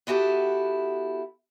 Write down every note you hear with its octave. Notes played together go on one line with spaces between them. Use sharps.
B3 E4 F#4 G4 A4